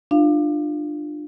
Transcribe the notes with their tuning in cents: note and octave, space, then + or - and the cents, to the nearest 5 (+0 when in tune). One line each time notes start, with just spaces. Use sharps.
D4 +25 F4 +0 F5 -10